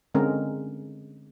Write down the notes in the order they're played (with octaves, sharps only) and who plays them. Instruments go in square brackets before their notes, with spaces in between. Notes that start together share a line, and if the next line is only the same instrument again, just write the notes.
[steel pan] D3 G#3 C4 C#4 A#4